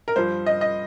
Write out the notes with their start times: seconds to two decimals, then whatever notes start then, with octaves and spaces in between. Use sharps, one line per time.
0.08 A#4
0.16 G2 F3 C5
0.46 D#5
0.61 D#5